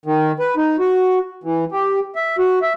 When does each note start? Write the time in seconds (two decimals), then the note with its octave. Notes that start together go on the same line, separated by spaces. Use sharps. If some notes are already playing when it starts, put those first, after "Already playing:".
0.06 D#3
0.40 B4
0.57 D#4
0.79 F#4
1.44 E3
1.72 G4
2.16 E5
2.39 F#4
2.62 E5